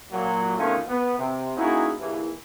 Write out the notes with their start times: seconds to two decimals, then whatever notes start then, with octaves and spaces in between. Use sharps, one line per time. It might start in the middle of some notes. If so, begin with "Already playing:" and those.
0.10 A#2 F#3
0.57 B2 D3 D#3 A3 C#4 F4
0.87 B3
1.17 C3
1.56 A#3 C#4 D#4 E4 F#4 G#4
1.98 A#1 D#2 E3